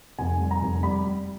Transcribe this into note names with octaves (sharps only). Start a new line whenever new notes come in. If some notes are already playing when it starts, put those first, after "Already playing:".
F1 G#5
G3
A#5
F1
G3 B5
G3